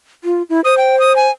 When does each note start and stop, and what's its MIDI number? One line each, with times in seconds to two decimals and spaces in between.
0.24 0.43 65
0.49 0.61 64
0.64 1.27 72
0.64 0.75 87
0.78 0.98 79
1.00 1.15 87
1.16 1.31 80